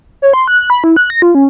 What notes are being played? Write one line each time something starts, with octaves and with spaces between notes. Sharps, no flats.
C#5
C6
F#6
B5
E4
F#6
A#6
F4
C#4